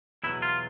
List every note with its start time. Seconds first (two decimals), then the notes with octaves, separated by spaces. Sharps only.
0.24 E2 B2 F#3 E4
0.42 F4